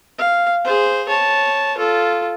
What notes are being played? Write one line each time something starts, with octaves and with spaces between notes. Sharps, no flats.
F5
G#4 C5
C#5 A5
F4 A4